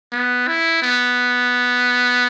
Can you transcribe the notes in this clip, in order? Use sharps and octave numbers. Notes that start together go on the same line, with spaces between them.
B3
E4
B3